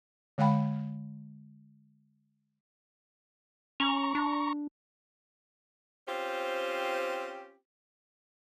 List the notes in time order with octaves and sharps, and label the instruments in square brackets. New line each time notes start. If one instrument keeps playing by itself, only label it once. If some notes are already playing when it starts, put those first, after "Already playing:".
[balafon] D3 G#3 F5 G5 B5
[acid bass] C#4 [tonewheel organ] A#5 C#6
[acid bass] D4
[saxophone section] C4 C#4 F4 G4 C5